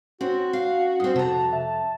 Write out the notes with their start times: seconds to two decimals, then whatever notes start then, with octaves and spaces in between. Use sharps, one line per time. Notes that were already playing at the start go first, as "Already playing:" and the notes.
0.21 C4 C#4 F#4
0.53 F5
1.00 G2 C4 D#6
1.16 F2 C3 A5 A#5
1.53 E5 A5